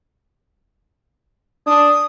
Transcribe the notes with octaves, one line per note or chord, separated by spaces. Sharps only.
D4 D#6